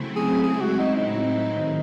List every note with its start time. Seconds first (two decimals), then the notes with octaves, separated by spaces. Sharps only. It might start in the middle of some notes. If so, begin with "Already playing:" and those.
Already playing: C#3 F#3 A3 C4 E4
0.16 G#4
0.43 C#3 G#3 C4 E4 G#4
0.61 F#4
0.79 D#4
0.96 A2 F#3 C4 D#4 E4
1.50 G#2 D#3